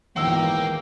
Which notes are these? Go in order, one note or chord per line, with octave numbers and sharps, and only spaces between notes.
G#1 E2 A#2 A#3 F#4 G5 E6